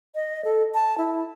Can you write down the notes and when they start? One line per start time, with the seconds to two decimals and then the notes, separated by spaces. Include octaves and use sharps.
0.15 D#5
0.45 A4
0.74 A5
0.98 E4